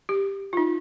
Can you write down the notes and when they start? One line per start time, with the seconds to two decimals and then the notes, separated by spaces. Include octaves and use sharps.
0.09 G4
0.53 F4
0.57 D#4